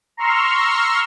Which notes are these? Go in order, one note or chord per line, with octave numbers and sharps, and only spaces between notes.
A#5 C6 C#6 E6 F6